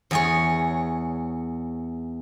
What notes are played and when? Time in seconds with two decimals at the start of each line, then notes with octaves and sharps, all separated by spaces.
0.11 E2 G#4 C#5